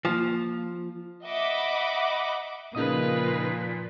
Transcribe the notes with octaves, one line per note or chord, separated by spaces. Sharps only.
F3 A#3
D#5 E5 F#5 B5 D6
A#2 C#3 F3 A#3 D#4 F4 B4 D#6